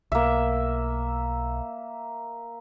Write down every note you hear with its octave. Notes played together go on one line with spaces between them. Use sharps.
B1 A#3 E5